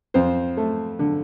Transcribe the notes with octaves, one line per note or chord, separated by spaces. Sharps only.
F2 C5
A3
D3